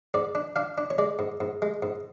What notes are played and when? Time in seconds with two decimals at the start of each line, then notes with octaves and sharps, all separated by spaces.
0.14 G#2 D5
0.35 D4
0.56 D4 F5
0.78 D4
0.90 C#5
0.98 G#3 D5
1.19 G#2
1.40 G#2
1.62 G#3
1.82 G#2